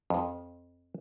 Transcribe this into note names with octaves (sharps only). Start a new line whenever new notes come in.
F2